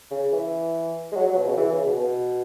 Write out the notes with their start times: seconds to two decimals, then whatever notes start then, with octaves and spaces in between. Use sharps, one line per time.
0.11 C#3
0.33 E3
1.12 G#3
1.16 F#3
1.27 F#3
1.37 B2
1.48 C#3
1.57 E3
1.71 C#3
1.85 B2
2.00 B2